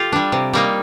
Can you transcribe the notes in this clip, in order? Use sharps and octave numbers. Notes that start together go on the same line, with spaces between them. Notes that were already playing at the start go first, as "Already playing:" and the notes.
Already playing: F4 G4 A4
G3 D4
C3
G3 A#3 D#4